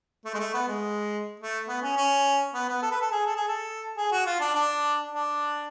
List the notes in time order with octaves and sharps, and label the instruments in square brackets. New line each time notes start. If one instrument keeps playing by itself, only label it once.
[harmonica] A3
G#3
A3
B3
G#3
A3
B3
C#4
C#4
B3
B3
A4
B4
A4
G#4
A4
G#4
A4
G#4
F#4
F4
D4
D4
D4